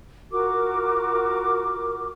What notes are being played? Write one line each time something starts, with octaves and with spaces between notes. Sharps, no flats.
F4 F#4 A#4 D6